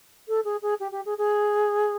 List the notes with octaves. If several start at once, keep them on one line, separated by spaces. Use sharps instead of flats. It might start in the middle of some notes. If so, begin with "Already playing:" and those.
A4
G#4
G#4
G4
G4
G#4
G#4